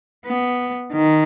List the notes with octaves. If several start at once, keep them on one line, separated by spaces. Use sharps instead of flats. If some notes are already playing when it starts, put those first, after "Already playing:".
B3
D#3